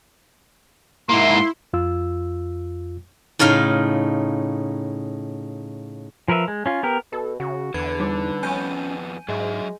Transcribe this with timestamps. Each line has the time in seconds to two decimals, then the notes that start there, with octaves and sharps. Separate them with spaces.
1.09 G#2 A#3 E4 C6
1.73 F2 F4 E6
3.39 A2 C#3 D#4 F5 C6
6.28 F3 A#4 B4 E5
6.48 G#3
6.66 C#4 F4
6.83 B3 G4 A#4
7.12 B2 A4
7.40 C#3 F#4
7.74 E2 D3 B4 G#6
8.00 G3 D#4
8.43 F2 B3 C#4 G#5 G6 D#7
9.29 G#2 F#3 G#3 E5